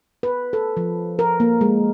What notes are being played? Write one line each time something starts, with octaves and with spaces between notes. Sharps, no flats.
B4
A4
F3
A#4
A#3
G#3